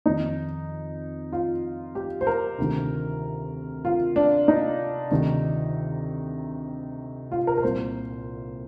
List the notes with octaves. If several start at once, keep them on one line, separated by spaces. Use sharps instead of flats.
F2 D#3 D#4
F4
G4
C5
A#4
D2 C3 D#3
F4
D4
D#4
D2 C3 D#3
F4
A#4
A#4
C2 A#2 C5